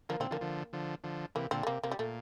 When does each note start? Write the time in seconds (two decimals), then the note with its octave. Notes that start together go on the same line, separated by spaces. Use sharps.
0.09 D3 F3 A#3
0.20 A#2 D3 C4
0.31 D3 F3 A#3
0.41 D3 F3
0.73 D3 F3
1.04 D3 F3
1.35 C3 E3 A#3
1.51 A#2 D3 C4
1.63 A3
1.67 C3 A#3
1.83 C3 A#3
1.91 G3
1.99 A#2 A3